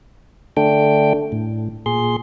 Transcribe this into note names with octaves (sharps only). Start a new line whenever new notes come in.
D3 A3 D4 G5
A2
A#2 G#4 C6